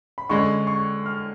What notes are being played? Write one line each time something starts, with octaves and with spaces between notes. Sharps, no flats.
B5
D3 G#3 C#4 C#6
C#6
F6